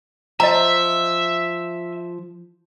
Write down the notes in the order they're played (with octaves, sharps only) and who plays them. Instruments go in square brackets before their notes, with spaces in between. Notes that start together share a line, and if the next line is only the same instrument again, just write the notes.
[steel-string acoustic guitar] F3 [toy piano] D#5 A#5 [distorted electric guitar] E5